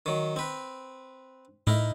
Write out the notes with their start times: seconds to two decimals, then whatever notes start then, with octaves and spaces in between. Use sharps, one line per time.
0.06 D#3 F#3
0.36 C4 B4
1.67 A2 D#4 E4 A#4